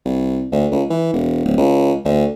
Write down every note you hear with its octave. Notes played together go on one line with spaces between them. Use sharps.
C2
D2
C#2
E3
E1
D1
C#2
D2